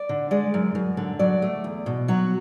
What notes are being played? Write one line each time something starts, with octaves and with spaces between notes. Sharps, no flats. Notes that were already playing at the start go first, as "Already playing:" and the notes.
Already playing: D5
D3
G#3 D5
F#2
F#2
D3
F#3 D5
A3
E2
B2
F#3 F#4